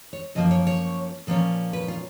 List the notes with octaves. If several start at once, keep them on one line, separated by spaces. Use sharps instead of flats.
C#5
F#2 F3 A#3 D#5
C#5
C#5
A#2 F3 A#3 C#4
B4
F4